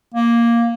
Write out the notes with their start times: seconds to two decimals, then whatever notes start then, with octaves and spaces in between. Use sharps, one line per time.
0.14 A#3